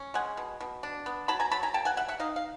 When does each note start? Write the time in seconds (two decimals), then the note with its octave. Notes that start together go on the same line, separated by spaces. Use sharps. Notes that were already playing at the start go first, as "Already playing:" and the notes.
Already playing: C#4
0.14 G#3 F#5 G#5
0.37 B2
0.60 B2
0.83 D4
1.06 B3
1.28 F#3 A5 B5
1.40 G#5 A#5
1.51 F#3 A5 B5
1.63 G#5 A#5
1.74 A#3 G5 A5
1.85 F#5 G#5
1.97 G3 E5 F#5
2.08 E5 F#5
2.20 D#4 D#5 F5
2.36 F5